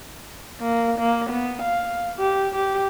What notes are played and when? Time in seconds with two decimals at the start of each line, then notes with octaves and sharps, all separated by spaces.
0.61 A#3
0.99 A#3
1.30 B3
1.62 F5
2.19 G4
2.55 G4